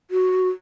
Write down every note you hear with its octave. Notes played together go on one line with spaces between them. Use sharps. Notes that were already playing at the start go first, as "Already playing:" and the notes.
F#4